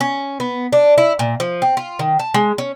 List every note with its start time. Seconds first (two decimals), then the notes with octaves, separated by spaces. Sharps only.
0.01 C#4
0.40 B3
0.73 D4
0.98 E4
1.19 A#2
1.40 F3
1.62 C4
1.77 F4
1.99 D#3
2.19 A5
2.34 G#3
2.58 C#4